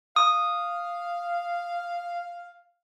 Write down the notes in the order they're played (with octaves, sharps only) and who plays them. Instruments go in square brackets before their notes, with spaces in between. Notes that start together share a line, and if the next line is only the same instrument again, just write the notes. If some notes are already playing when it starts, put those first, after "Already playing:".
[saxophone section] F5 [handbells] D#6